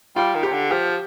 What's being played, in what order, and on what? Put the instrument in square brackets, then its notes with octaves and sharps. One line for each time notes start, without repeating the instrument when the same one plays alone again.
[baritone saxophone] G3 [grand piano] F4
[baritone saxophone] D#3
[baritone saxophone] C3 [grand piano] G4
[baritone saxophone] D3
[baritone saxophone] F3 [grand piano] G4